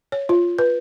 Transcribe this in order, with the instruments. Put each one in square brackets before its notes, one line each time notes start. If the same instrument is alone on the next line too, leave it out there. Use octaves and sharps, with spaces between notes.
[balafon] C#5
F4
B4